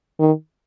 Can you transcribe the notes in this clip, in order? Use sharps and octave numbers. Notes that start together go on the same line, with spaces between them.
D#3